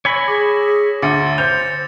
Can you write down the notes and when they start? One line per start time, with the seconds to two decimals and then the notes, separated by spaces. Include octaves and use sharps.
0.05 C#5 G#5 B5 E6 A#6
0.28 G#4 D6
1.02 D2 C6 D6 A6 C#7
1.38 C5 G6 F7